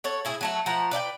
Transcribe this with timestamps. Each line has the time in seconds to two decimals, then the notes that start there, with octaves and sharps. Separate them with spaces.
0.04 A4 C#5 F#5
0.25 A2 E4 G#4
0.41 F#3 A3 F#5
0.66 F3 A3 F#5 A#5
0.91 B4 D5 F5 G5